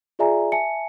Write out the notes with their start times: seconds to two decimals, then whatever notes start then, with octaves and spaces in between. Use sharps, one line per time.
0.19 F4 G#4 D5 E5 G#5 A#5
0.52 E5 G#5 A5 C#7